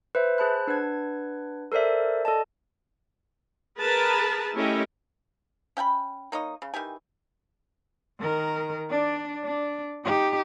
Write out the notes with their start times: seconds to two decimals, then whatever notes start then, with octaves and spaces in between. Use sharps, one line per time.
0.15 B4 C5 E5
0.38 G#4 C5 A5 B5 F#6
0.67 D4 B4 F#5 G#6
1.72 A4 A#4 C5 D5 E5
2.25 A4 D5 D#5 A5
3.79 G#4 A#4 B4 A5
4.55 A3 C#4 E4 G4 A#4 D#5
5.77 C#4 G5 G#5 B5
6.32 A#3 D#4 C#5 D#5
6.62 C#3
6.74 D#3 E3 G4 G#5
8.20 D#3 A#4
8.90 D4 D5
9.44 D4 D5
10.05 D#4 G4